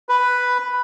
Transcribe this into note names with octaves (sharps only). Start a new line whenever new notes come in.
B4